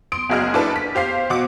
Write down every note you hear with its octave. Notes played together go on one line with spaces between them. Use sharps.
C6 D#6 D7
F#1 F#4 G#4 D#5 F6
D4 E4 A4 B4
B6
G4 C5 F5 C7
B2 F#5 D6